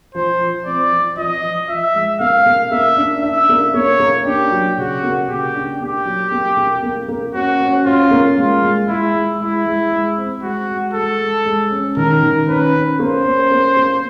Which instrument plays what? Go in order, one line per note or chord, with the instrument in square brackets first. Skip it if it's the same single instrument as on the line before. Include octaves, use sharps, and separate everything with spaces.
[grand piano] F3 [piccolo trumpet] C5
[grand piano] F3
[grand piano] C4 [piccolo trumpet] D5
[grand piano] F3
[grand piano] F3 [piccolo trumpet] D#5
[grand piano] F3
[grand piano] F3 [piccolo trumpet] E5
[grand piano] G#3
[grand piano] A#3 [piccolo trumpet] F5
[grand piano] A#3
[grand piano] A#3 [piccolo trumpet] E5
[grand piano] D4
[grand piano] D4 [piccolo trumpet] E5
[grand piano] A#3
[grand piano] A#3 [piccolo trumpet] C#5
[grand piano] A#3
[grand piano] D4 [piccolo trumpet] G4
[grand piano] F#3
[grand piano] C#3 [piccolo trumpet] F#4
[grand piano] A#3
[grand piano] C#3 [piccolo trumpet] G4
[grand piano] D4
[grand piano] A#3 [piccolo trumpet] G4
[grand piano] F#3
A#3
A#3
A#3
A#3
[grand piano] C#4 [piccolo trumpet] F#4
[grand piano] C#4
[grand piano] C#4 [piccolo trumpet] F4
[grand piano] A#3
[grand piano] G#3 [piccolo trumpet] F4
[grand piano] G#3
[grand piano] G#3 [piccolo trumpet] E4
[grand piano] G#3
[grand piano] G#3 [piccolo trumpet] E4
[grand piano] G#3
G#3
C4
[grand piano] G#3 [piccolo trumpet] F#4
[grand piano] G#3
[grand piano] G#3 [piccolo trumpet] A4
[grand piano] G#3
G#3
C#4
[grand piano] D#3 [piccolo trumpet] A#4
[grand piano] D#3
[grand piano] C#4 [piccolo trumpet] B4
[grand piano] C#4
[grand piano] A#3 [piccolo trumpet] C5
[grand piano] C#4
A#3
A#3